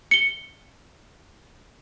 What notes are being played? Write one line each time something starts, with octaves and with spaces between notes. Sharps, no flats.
C#7 G7